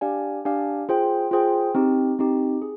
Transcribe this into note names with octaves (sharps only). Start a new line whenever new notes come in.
D4 G4 D5 F5 G#5
D4 G4 D5 F5 G#5
F4 G#4 C5 G5
F4 G#4 C5 G5
C4 D#4 G4
C4 D#4 G4
G#4